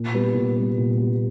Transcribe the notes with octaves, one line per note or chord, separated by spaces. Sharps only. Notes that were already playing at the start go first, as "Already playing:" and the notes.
Already playing: A#2
G3 B3
A#2
G3 B3
A#2
G3 B3